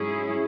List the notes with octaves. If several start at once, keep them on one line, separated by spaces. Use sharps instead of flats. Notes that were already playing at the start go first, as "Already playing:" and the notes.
Already playing: G#2 F#3 C#4 E4 G#4